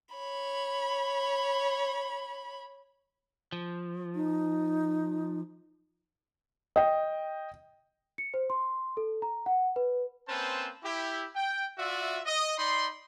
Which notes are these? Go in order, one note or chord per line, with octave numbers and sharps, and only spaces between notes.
C#5 B5
F3
D#4
D#5 G5
C#7
C5
C6
A4
A#5
F#5
B4
A#3 C4 C#4 B4 C5 A5
E4 G4
G5
F4 F#4 D5 E5
D#5
D#4 D5 B5 C6